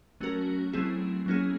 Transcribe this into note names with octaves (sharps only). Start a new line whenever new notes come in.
F#3 A3 C#4 F#4 A#4
F#3 A3 C4 E4 G#4
F#3 A#3 C#4 E4 G#4